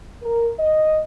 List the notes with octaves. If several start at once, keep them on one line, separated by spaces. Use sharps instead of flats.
A#4
D#5